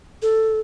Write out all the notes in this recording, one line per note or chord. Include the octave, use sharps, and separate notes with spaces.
A4